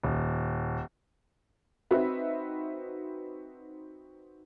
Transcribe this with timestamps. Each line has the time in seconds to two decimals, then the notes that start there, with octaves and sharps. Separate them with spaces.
0.03 D#1
1.91 C4 D#4 F#4 B4 E5